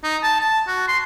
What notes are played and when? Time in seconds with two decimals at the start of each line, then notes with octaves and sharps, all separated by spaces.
0.04 D#4
0.23 A5
0.40 A5
0.67 F#4
0.88 C6